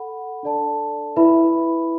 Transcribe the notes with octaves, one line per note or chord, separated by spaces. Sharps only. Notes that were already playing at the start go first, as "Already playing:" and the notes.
Already playing: A4 F#5 B5
D4 A4 D5 A5
E4 B4 E5 B5